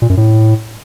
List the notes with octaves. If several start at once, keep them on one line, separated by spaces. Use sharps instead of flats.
A#2
F#2
A2